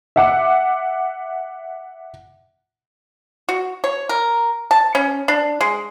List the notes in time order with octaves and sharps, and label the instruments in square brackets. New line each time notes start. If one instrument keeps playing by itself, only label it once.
[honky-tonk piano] E5 F#5 D6
[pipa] F#4
C#5
A#4
A5
C#4
D4
G#3